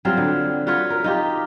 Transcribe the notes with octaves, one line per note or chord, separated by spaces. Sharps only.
F#3 G3 C4 F4
D3
F4 F#4 B4 C#5
A#4
D#4 F4 G4